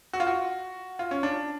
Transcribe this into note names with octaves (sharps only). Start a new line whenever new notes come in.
F#4
F4
F#4
F4
C#4
D4